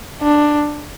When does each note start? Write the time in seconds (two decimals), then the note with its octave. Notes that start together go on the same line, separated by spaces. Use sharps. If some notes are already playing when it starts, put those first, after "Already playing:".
0.22 D4